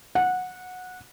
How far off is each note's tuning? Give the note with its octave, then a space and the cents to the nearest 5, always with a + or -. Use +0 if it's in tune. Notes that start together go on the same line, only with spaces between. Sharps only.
F#5 -15